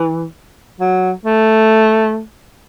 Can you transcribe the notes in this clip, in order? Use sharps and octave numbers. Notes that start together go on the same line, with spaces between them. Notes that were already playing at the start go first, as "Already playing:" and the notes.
Already playing: E3
F#3
A3